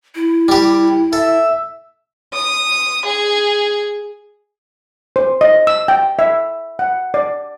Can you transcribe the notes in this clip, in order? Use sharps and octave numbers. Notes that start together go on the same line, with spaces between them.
E4
G3 G4
A4 E5
D#6
G#4
C5
D#5
E6
G5
E5
F#5
D5